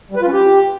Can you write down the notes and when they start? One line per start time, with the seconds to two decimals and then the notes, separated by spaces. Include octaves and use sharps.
0.11 G3
0.16 B4
0.22 F4
0.27 C#4
0.32 G4